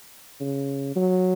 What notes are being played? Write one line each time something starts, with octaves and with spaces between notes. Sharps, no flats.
C#3
F#3